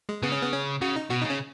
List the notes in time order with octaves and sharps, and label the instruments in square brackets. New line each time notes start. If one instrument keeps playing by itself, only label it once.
[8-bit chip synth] G#3
[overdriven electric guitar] C#3 [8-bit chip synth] B3
[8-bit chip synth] C#4
B3
C#4
[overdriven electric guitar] C#3 [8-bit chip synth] F#4
[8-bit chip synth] D#4
[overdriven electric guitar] B2 [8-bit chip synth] F#4
[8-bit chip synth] D#4
[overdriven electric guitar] C#3 [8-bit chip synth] C#4